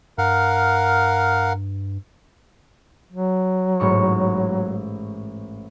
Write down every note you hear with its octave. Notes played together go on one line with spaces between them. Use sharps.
G2 A#4 F5 F#5
F#3
A1 G#2 C#6